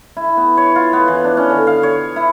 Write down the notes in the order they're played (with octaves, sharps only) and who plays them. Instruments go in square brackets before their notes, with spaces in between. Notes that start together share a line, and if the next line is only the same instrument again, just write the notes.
[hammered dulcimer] E4
B3
C#5
F4
B3
E3
D4
C#4
D3
F5
C#5
E4